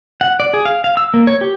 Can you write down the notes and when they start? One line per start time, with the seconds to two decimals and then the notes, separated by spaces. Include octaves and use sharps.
0.21 F#5
0.40 D5
0.54 G#4
0.65 F5
0.84 F5
0.97 E6
1.14 A#3
1.27 C#5
1.41 G4